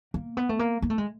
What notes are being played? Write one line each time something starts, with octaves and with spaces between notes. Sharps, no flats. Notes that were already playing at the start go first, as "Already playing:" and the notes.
A#3
B3
A3
A#3
A#3
A3
G#3